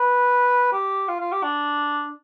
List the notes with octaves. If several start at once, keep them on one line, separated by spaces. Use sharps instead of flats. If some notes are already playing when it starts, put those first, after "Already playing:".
Already playing: B4
G4
F4
F4
G4
D4